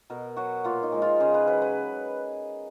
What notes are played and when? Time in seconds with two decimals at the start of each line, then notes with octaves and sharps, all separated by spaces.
0.10 B2 A#4
0.36 F#3 F#4
0.64 A#2 F4
0.83 D#4
0.92 F3 G#3
1.02 F4
1.20 C#3 G#4
1.34 B4
1.47 F#3 B4
1.62 B4